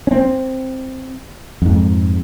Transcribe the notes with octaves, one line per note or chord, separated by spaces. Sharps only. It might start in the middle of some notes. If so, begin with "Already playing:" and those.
C4 C#4
F2 G#2